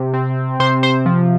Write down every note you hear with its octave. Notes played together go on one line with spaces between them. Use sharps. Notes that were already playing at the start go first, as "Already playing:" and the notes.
Already playing: C3
C4
C3 C5
C5
F3